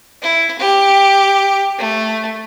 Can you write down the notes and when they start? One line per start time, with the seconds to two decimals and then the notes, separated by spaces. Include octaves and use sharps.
0.22 E4
0.59 G4
1.79 A3